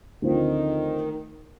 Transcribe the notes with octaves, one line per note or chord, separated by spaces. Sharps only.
D2 D3 D#3 F3 C4 F4